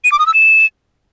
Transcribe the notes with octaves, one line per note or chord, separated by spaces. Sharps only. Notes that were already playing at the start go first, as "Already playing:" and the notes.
D#7
D6
D#6
E6
E7